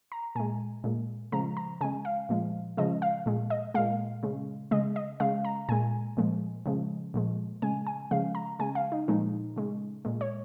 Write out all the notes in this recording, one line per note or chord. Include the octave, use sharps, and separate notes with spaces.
A#5
A#2 G#3 G#5
A#2 G#3
C#3 F3 G#3 A#5
A#5
C#3 G#3 G#5
F5
A#2 F3 G#3
C#3 F3 G#3 D#5
F5
A#2 G#3
D#5
A#2 G#3 F5
C#3 G#3
C#3 G#3 D#5
D#5
C#3 G#3 F5
A#5
A#2 G#3 G#5
A#2 F3 G#3
C#3 F3 G#3
A#2 F3 G#3
C#3 G#3 G#5
G#5
C#3 F3 G#3 F5
A#5
C#3 G#3 G#5
F5
D#4
A#2 F3 G#3 D#4
C#3 G#3
A#2 G#3
C#5